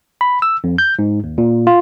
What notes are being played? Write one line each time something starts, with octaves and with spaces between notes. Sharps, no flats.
B5
E6
F2
G6
G#2
D#2
A#2
F4